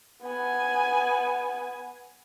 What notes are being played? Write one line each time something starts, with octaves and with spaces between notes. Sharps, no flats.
B3 G#5